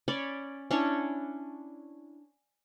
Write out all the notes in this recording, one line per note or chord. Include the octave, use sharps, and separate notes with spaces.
C#4 C#5 D5 B5
C#4 D4 E4 C#5